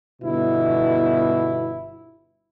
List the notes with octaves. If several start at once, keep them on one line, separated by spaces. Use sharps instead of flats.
G1 B2 E4